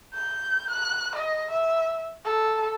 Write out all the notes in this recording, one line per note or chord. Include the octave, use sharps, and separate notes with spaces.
G6
F#6
D#5
E5
A4